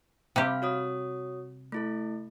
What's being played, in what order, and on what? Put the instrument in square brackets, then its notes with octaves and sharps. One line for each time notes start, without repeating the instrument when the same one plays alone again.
[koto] C3 G3 G4 [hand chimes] F5 B5 F6
[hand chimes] F#4 C#5 D#6
A3 E4 A4